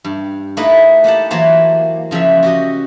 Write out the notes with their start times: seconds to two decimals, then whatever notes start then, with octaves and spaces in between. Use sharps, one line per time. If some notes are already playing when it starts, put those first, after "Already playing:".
0.05 G2
0.57 A3 A#3 D#4 E4 A4 B4
1.04 A#3 G4 F#5 A5
1.31 E3 F#3 A#3 C5 C#5 A5
2.11 C#3 F3 F#3 E5
2.43 F#4 G4 D#5